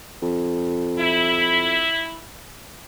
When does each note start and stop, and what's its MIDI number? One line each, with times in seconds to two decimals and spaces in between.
0.22 1.88 41
0.99 2.25 64